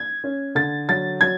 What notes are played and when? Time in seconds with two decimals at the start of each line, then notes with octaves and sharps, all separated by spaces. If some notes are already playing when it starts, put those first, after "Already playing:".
Already playing: G#6
0.24 C#4
0.55 D3 A6
0.89 F#3 A6
1.21 F#3 G#6